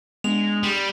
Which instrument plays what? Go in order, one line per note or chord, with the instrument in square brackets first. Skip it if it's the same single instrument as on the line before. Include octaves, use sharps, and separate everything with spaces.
[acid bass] G#3 [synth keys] B3 D4 [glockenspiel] F7
[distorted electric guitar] G3